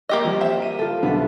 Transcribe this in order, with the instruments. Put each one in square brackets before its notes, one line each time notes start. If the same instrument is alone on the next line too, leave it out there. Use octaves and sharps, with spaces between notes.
[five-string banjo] A#3 G4 D#5 [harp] E6
[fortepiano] F3 G3 [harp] C4
[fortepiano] C5 E5
[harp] D#7
F4 A4
[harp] B1 E5 [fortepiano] G2 D3 B3